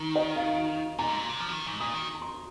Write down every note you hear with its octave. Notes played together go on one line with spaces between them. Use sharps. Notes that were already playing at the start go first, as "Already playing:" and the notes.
Already playing: D#3
D#5
F5
A#2 A#5
G#2
A#2
C3
F3
C3
D#3
G#2
A#2 D#6
D#3
A#5
C6